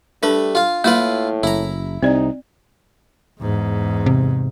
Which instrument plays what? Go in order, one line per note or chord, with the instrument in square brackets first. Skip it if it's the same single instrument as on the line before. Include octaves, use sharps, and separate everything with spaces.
[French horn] G3 [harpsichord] A3 B4 [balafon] D4
[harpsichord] F4 F5
[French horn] A2 [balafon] A#3 [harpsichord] E4 F4 B4
[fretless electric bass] F#1 [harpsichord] E4 A#5
[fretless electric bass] C2 C3 [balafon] C4 D5 [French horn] D#4
[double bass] E2 G#2
[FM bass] C3